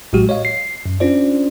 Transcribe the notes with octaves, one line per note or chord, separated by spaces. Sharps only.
A1 A2 F#3 G#3 F#4 G4
C#5 D#5 F5
C7
F#2
C#4 D4 F4 C5 D5